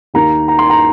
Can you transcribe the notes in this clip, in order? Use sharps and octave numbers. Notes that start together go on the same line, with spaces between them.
D#2 D#3 A#3 A#5
A#5
C6
A#5